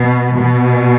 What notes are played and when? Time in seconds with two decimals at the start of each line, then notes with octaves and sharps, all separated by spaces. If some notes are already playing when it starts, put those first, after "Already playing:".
Already playing: B2
0.36 B2